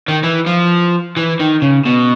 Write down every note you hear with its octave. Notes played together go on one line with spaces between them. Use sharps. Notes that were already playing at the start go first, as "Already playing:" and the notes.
D#3
E3
F3
E3
D#3
C#3
B2